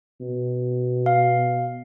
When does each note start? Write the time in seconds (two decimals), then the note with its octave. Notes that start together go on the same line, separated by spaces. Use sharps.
0.21 B2
1.06 F5